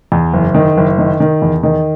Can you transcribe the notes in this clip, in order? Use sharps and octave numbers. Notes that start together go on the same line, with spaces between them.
E2
F#1
D#3
F#1
D#3
D#3
E2
D#3